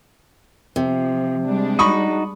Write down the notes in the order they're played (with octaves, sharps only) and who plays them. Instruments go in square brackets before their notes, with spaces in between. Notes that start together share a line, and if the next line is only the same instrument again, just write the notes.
[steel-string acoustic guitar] C3 [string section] F3
[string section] G3 G#3 D4
[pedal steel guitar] D#4 F#4 [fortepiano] B5 C#6 D#6